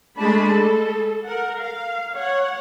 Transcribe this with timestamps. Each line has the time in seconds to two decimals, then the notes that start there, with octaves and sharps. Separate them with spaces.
0.18 G#3 A3 D4 A5 B5
0.52 A4
1.27 A#4 F#5
1.59 F5
2.15 C#5 F#5